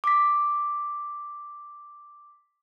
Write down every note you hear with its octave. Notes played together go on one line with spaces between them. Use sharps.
D6 B6